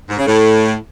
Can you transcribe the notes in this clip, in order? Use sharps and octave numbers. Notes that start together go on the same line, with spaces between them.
G#2
C#3
A2